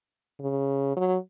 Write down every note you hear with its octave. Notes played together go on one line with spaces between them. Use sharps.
C#3
F#3